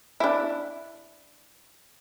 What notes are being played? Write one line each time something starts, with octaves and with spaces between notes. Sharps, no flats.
D4 E4